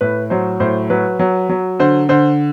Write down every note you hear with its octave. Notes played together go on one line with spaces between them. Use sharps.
A2 B4
F#3 C5
A2 C5
F#3 B4
F#3
F#3
D3 C5
D3 C5